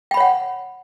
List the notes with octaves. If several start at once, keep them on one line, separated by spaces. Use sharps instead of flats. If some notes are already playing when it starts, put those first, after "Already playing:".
C#5 F#5 G5 B5